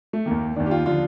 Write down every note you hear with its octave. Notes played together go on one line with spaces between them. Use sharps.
A3
D#2 D#3 A#3
D#2 D#3 D4
G4
F4
D3 F3 F4